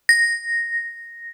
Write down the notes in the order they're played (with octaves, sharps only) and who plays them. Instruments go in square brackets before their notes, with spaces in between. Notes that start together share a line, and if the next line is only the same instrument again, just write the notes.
[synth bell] A#6